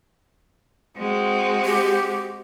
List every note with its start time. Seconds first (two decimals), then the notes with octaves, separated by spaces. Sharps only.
0.96 G#3 C4 F#4
1.65 G4